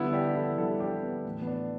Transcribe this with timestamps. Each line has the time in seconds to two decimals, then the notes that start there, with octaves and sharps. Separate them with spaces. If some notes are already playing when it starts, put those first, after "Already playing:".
Already playing: D3 G3 B3 E4
0.13 D4 G4
0.35 E4 A4
0.58 D3 G3 E4 A4
0.80 D4 G4
1.03 B3
1.25 A2 E3 A3
1.42 B3
1.47 D4